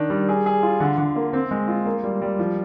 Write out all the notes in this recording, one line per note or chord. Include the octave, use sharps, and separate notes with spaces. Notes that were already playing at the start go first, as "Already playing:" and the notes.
Already playing: D#3 D4
G3
G#4
G#4
F4
D3
D3
A#3
C4
G#3
F4
A#3
G3
G3
F3